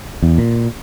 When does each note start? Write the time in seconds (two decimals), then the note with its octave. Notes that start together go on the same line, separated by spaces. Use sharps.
0.22 E2
0.38 A#2